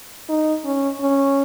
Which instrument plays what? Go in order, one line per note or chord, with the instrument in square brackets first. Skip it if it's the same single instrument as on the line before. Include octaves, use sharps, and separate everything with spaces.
[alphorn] D#4
C#4
C#4